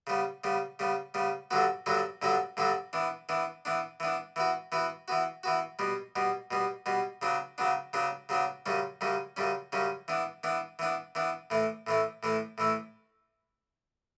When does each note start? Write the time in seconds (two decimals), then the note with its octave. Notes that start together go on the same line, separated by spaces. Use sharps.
0.07 C#3 G3 B3
0.44 C#3 G3 B3
0.79 C#3 G3 B3
1.14 C#3 G3 B3
1.51 G2 D3 F#3 B3 F#4
1.86 G2 D3 F#3 B3 F#4
2.22 G2 D3 F#3 B3 F#4
2.57 G2 D3 F#3 B3 F#4
2.93 E3 B3 D4
3.29 E3 B3 D4
3.65 E3 B3 D4
4.00 E3 B3 D4
4.36 E3 B3 F#4
4.72 E3 B3 F#4
5.08 E3 B3 F#4
5.43 E3 B3 F#4
5.79 B2 G3 B3
6.16 B2 G3 B3
6.51 B2 G3 B3
6.86 B2 G3 B3
7.22 C#3 F#3 B3 D4
7.58 C#3 F#3 B3 D4
7.93 C#3 F#3 B3 D4
8.29 C#3 F#3 B3 D4
8.66 F#2 C#3 G3 C#4
9.01 F#2 C#3 G3 C#4
9.37 F#2 C#3 G3 C#4
9.72 F#2 C#3 G3 C#4
10.08 E3 B3 D4
10.43 E3 B3 D4
10.79 E3 B3 D4
11.15 E3 B3 D4
11.50 A2 E3 A3
11.87 A2 E3 A3
12.23 A2 E3 A3
12.58 A2 E3 A3